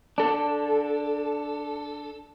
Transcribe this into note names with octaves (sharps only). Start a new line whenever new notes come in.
D4 A4